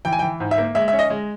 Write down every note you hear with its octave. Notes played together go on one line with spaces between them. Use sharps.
E3 G5
G#5
G5
E3
G#2
E5
A#3
G#3 E5
C#4 E5
D#5
G#3